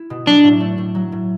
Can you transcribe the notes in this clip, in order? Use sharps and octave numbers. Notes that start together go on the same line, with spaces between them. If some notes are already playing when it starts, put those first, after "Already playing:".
Already playing: E4
B2
F#3 D4
A2
A3
A2
F#3
A2